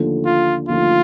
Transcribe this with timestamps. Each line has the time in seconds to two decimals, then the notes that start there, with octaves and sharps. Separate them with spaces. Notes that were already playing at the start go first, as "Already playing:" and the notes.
Already playing: D#2 D3 F3 A3
0.25 F4
0.69 D#2 D3 F3 A3 F4